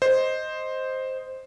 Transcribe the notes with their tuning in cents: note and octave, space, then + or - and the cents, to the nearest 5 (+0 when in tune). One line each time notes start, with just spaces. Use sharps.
C5 +0 D#5 +0